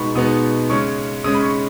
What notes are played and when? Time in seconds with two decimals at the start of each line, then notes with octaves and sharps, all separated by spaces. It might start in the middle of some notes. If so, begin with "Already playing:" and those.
Already playing: B2 G#3 B3 D#4 B5 C#6
0.15 B2 G#3 B3 D#4 D#6
0.70 C#3 G#3 C#4 C#6
1.24 C#3 G#3 C#4 D#6
1.35 B5
1.43 C#6